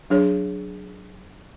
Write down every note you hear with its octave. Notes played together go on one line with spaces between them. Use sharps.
F#3 D4 G#4 C#5